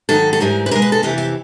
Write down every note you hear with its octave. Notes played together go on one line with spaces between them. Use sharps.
G#2 D#3 F#3 A4
A4
G#2 E3 G3 A#4
B4
B2 G#3 A#4
B4
A4
F2 C3 E3 G4
G4